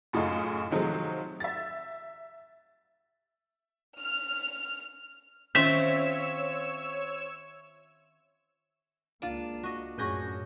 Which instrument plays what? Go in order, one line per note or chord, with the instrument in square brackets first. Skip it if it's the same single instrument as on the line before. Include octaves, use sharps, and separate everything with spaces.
[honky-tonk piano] F#2 A2 C#3 D#4 F4
C3 D#3 F3 F#3 G#3 A3
E5 A6
[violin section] F6
[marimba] D#3 C#4 [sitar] C4 F4 [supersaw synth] C#5 E6 E7 [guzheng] E5
[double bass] C#2 A#3 [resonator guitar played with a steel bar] D4 F4
[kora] F#4 D#5
[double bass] F#2 C#4 [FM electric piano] A2 G6 A#6 [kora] F#4 G#4 B4